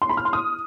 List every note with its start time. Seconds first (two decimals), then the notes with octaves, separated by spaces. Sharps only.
0.02 C6
0.09 B5
0.17 F6
0.25 C6
0.33 D#6